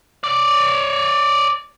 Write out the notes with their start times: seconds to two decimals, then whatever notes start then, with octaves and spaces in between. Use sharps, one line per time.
0.24 C#5 D5